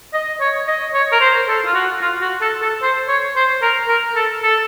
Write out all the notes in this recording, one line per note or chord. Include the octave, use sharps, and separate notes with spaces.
D#5
C#5
D#5
C#5
A#4
C5
A4
F4
F#4
F4
F#4
A4
A4
C5
C#5
C5
A#4
A#4
A4
A4